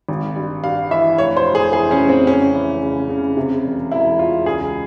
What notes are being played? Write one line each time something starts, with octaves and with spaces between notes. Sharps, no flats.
G#1
G2
G2 F5
E3 E5
F1 C#5
C5
F1
G#4
E3 G#4
C#4
F1
C4
C#3 C#4
E3
C#3
C#3
C3
E1
E1 E4
E1 F4
C#2 G#4